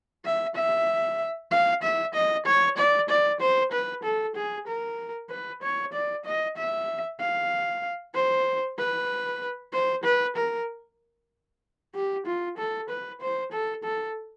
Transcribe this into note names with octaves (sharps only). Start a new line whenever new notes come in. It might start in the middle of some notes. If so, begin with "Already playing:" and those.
E5
E5
F5
E5
D#5
C#5
D5
D5
C5
B4
A4
G#4
A#4
B4
C#5
D5
D#5
E5
F5
C5
B4
C5
B4
A#4
G4
F4
A4
B4
C5
A4
A4